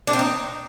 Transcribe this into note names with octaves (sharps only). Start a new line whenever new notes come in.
D4
C4
D#4